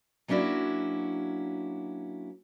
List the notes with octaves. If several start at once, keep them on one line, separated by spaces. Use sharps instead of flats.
F#3 A#3 C#4 D4 E4 F#4